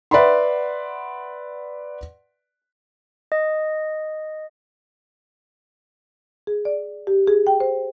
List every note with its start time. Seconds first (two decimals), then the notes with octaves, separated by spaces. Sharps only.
0.11 B4 D5 E5 F#5 B5 C6
3.32 D#5
6.47 G#4
6.65 D5
7.07 G4
7.27 G#4
7.47 G5
7.60 C5